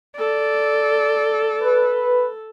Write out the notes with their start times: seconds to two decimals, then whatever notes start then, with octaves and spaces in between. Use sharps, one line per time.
0.19 A4 D5
1.62 B4